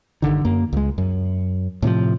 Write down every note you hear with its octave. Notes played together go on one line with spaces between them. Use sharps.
G1 C2 D3 D#3
F#2 A#3
C#2 G#3
F#2
A2 C3 D#3 F3